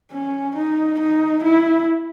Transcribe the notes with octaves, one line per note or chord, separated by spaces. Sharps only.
C#4
D#4
D#4
E4